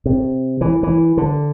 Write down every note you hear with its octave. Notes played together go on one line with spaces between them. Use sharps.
C3
E3
E3
D3